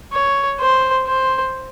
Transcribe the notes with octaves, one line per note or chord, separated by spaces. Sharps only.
C#5
C5
C5